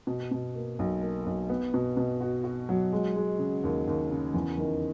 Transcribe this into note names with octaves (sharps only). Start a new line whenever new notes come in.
B2
B2
A#3
B1
A#3
B1
B3
B2
B2
F#4
F#4
F#3
G#3
G#3
C#3
D#2
D#2
C#3
E2
D#3